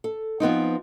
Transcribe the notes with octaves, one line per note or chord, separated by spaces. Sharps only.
A4
F3 B3 C4 D#4